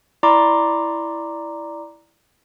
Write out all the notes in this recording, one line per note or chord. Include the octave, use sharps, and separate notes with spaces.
E4 D5 A#5 C6 D6